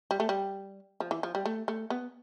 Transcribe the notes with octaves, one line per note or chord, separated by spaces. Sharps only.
G3
A3
G3
F3
E3
F3
G3
A3
A3
B3